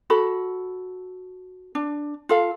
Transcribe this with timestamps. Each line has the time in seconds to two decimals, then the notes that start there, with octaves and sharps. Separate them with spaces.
0.10 F#4 A4 B5
1.75 D4
2.29 F4 A4 F5